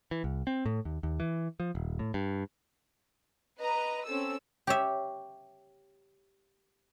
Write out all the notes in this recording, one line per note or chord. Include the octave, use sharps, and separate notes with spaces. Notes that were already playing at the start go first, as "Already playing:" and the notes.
E3
C2
C4
A2
D#2
D#2
E3
F3
D#1
A2
G2
B4 D#5 A#5
C4 C#4 A4 E6
G4 C#5 E5